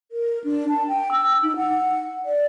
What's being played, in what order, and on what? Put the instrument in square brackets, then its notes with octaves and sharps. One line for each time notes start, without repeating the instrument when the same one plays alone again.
[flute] A#4
D4
A5
G5
E6
D#4
F#5
D5